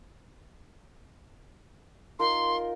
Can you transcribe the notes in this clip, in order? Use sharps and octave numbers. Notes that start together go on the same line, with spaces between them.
D#4 F4 A#4 C6